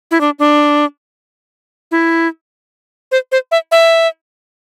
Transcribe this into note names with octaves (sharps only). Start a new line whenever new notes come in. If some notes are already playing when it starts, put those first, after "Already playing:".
E4
D4
D4
E4
C5
C5
E5
E5